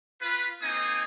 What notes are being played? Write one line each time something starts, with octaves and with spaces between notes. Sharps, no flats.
F4 B4
A#3 C4 D#4 G#5 D#6